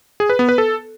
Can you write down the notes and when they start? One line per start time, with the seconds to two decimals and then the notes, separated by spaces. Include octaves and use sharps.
0.20 G#4
0.30 B4
0.39 B3
0.49 B4
0.58 A4